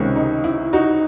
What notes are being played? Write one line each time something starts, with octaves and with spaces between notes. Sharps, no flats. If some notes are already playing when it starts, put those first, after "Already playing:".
Already playing: C#2 C3 D#3 G#3 C#4
D#4
E4
D#4 F#4